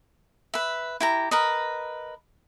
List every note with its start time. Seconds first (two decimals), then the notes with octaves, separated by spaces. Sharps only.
0.54 B4 E5
1.00 E4 G4 A#5
1.31 A#4 B4 D#5